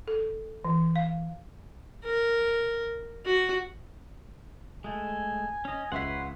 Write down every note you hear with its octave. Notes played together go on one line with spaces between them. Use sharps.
A4
E3
F5
A#4
F#4
G#3 A3 G#5
C#4 D#5
C#2 B4 C#5 E5 F#5 C6 B6